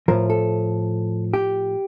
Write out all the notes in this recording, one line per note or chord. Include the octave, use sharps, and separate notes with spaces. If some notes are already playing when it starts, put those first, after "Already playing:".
A2 F3 A#4
A4
G4